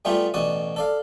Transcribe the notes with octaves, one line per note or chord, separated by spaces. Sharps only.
G3 A3 B3 F4 G4 G#4
A1 B2 F#4 D5 D#6
A4 D5 F5